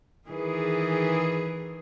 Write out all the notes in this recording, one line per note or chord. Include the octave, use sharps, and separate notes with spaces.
D#3 E3 G#4